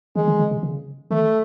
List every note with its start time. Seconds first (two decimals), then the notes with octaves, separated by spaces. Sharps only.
0.16 D#3 G#3
0.28 D3
0.39 C#3
0.51 C3
0.63 C#3
1.11 D#3 A3